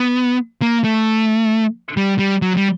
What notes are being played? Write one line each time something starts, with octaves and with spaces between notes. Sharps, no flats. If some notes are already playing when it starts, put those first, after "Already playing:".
Already playing: B3
A#3
A3
G3
G3
F#3
G3